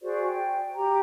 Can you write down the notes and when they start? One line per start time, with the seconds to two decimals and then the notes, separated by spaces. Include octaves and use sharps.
0.02 F#4 G#4 C5 D5
0.25 G5
0.75 G4 A#5